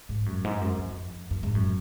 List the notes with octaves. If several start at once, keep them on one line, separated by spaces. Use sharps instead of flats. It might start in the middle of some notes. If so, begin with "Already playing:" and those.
G#2
F#2
G#2
F#2
F2
F#2
G#2
F#2